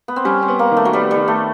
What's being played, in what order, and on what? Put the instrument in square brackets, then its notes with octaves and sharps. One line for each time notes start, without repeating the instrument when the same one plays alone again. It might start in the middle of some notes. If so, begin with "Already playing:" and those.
[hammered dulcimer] B3
C4
[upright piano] G3 [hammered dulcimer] C#4
[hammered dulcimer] C4
[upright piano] B3
[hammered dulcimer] A#3
[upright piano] D#3
[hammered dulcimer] A3
F#3
[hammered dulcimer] G3 [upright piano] B3
[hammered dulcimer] G3
[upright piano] D#3
[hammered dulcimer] A3